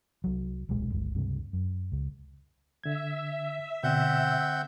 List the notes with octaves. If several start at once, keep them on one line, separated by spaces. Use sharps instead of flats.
C2 F#3
D1 B1 A#2 G#3
G1 C#2 G2 G#3
C#2 G2 C3
F#2
C#2
D3 E5 G#6
B2 D3 C4 F#5 G6